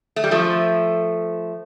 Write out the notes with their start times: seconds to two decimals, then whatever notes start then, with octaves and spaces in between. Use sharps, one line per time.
0.16 A3
0.24 G3
0.31 F3 A3